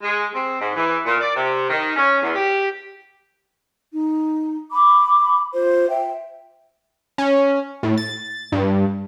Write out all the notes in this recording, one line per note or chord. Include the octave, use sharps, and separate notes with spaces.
G#3
C4
G#2
E3
A#2
D5
C3
D#3
C#4
E2
G4
D#4
B5 D6
F4 C5
E5 G5
C#4
A2
A6
G2